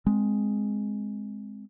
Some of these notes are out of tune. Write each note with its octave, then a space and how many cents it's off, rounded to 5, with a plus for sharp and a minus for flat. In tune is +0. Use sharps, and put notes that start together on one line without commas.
G#3 +0 C4 -5